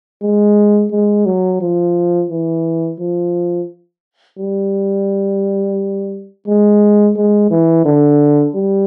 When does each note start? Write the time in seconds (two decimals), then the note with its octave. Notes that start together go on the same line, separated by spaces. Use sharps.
0.22 G#3
0.91 G#3
1.26 F#3
1.61 F3
2.30 E3
2.99 F3
4.38 G3
6.47 G#3
7.16 G#3
7.51 E3
7.85 D3
8.55 G3